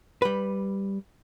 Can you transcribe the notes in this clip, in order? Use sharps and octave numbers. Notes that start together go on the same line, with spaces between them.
G3 B4